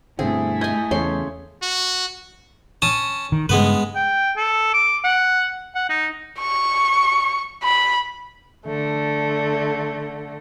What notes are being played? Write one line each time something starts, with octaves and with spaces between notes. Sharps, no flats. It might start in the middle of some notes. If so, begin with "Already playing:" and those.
G2 B2 D3 A3 C4 E4 G#4
D#5 G#5 G6 G#6
E2 C#3 A4 C#5 C6
F#4
C#4 A5 D#6
D#3
G2 C#3 G#3 B3 B4
G5
A4
D6
F#5
F#5
D#4
C#6
B5
D3 A3